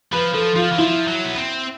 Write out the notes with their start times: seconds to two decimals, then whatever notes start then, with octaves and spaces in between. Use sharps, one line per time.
0.12 F3 B4
0.34 F3 A4
0.56 F3 F4
0.72 E3
0.78 F3 E4
1.08 F#3
1.25 B3
1.37 C4